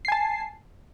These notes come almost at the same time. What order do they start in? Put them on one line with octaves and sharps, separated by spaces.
C7 G#5 A5